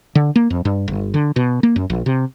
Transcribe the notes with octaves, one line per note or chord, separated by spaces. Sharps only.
D3
A#3
F2
G2
G1
D3
B2
A#3
F#2
A#1
C3